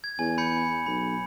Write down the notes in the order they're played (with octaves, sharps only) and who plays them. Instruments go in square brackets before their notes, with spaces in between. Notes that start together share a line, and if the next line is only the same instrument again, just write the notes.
[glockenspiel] G#6
[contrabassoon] E2 [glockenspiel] G#5
[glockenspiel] B5 G6 C#7
[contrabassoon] B1 [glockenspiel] B5